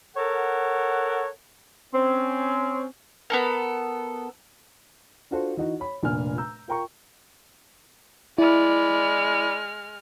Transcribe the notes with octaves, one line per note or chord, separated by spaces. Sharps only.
A4 A#4 C#5 F#5
C4 C#4
B3 A4 A#4
D4 F4 F#4 A4 C5
E3 D#4 F#4
C#5 B5
F1 A#2 D4 G#5 F6
A#5 E6 G6
F4 A#4 G5 A#5 C#6
G#3 E4 D5 B5 F6